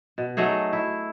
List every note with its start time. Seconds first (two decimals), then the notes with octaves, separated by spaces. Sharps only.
0.18 B2
0.37 F#3 A3 D#4 G#4
0.73 E4